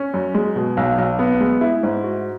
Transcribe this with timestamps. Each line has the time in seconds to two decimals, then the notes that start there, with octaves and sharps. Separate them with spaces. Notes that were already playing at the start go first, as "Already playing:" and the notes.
Already playing: C#4
0.14 F#2
0.35 G#3
0.56 B2
0.77 B1
0.98 B1
1.19 B3
1.41 G#3
1.61 E4
1.83 G#2
2.03 F#4